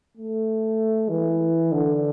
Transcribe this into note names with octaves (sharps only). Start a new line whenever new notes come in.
A3
E3
D3